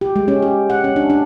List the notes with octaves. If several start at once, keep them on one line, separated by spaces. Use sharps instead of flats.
G4
G#3
C#4
G4
F#5
C#4
D4
D4